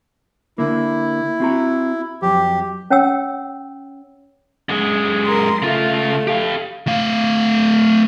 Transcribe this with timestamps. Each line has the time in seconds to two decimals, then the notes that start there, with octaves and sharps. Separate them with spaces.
0.58 D3 A#3 E4
1.40 C4 F#4 A#5
2.22 F2 F#3 G4
2.90 C#4 C#5 F#5 G5 E6
4.69 F#2 G#3
5.26 A#4 C6
5.62 C#3 A3 F4
6.27 G4 F5
6.87 A3 F5